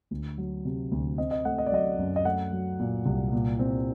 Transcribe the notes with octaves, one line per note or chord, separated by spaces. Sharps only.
D2
F#3
C3
D2
C4 D#5
D#5
A3 F#5
D#5
D5
F#3 D#5
F#2
D#5
A3 F#5
F#3
A#2
C2
A#2
C4